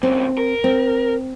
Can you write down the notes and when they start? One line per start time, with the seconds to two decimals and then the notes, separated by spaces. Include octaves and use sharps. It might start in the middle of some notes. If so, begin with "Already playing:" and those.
0.03 D#2 C#3 C4
0.38 A#4
0.64 C4